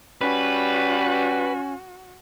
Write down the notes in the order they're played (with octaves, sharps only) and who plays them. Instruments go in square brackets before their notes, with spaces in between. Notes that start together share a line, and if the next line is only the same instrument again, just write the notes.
[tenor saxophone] G3 [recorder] C#4 [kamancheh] F#4 [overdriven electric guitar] B4